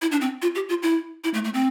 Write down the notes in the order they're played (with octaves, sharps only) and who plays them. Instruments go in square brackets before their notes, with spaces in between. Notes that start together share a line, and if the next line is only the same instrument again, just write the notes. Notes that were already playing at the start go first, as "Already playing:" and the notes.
[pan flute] E4
D4
C4
F4
G4
F4
E4
E4
A3
A3
C4